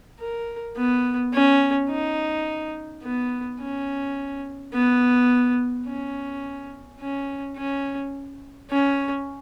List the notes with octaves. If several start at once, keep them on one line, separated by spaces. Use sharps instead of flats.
A#4
B3
C#4
D#4
B3
C#4
B3
C#4
C#4
C#4
C#4